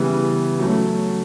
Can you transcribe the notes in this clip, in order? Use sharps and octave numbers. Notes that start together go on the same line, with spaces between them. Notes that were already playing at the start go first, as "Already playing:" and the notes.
Already playing: C#3 E3 G3 B3
F#3 A3 C#4